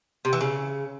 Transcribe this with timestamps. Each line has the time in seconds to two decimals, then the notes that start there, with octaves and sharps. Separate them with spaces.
0.25 C3
0.33 E3
0.41 C#3